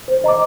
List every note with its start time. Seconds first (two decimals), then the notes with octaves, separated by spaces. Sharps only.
0.08 C5
0.24 D#5 A#5 D6